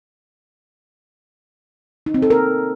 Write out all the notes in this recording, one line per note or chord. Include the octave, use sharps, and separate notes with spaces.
D#4
C4
A4
A#4